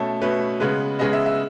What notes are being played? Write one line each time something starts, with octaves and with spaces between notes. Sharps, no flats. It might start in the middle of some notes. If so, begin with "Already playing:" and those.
Already playing: B2 A3 C#4 A4
B2 A3 C#4 B4
C#3 G#3 B3 B4
C#3 G#3 B3 D#5
E5
E5